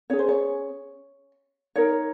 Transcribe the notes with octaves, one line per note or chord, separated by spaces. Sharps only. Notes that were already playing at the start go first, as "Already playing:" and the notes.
C#4 G#4 C#5
C5
C#5
D#4 A#4 C#5